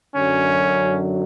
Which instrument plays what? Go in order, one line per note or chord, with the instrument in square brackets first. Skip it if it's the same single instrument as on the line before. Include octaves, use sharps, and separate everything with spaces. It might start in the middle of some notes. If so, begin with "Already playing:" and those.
[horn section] F#2 D3 F#3 C#4